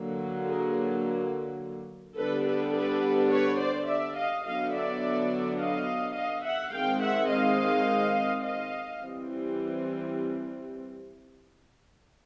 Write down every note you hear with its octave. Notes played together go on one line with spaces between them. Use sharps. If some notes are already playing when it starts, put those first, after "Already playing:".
Already playing: D3 F#3 A#3
G#4 A#4
D3 G3 B3 D4 A4 B4
A4 B4
A4 B4
B4 C#5
C5 D5
D5 E5
D#5 F5
D3 F#3 B3 D4 D#5 F5
D5 E5
D#5 F5
D#5 F5
E5 F#5
D#3 G#3 C4 F5 G5
E5 F#5
D#5 F5
D#5 F5
E3 G3 C4